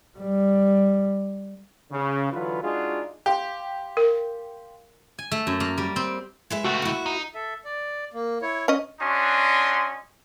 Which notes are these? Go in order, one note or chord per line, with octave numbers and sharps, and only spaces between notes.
G3
C#3
D3 E3 F#3 F4 B4
G#3 D4 D#4 F4 F#4 G#4
G4 F5 G5 C6
A#4
G#5
A3
F#2
A#3
G3
C4
G#3 B4 E5
C#2 A3 F#4 F#5
D#2 E4
D#4
A4 E5
D5
A#3
E4 C#5
C#4 D#5
C#4 D4 F#4 D#5 C6